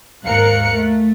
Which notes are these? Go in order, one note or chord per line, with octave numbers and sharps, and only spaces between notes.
D#2 G#2 A#4 F5 F#6 C#7
A3